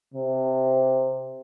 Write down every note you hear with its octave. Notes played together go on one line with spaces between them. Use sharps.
C3